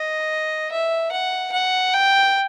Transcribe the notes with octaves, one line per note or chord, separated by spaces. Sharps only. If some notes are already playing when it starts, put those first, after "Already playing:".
Already playing: D#5
E5
F#5
F#5
G5